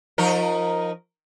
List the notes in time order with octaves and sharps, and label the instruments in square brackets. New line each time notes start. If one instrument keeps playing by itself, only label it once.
[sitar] F3 D#4 A#4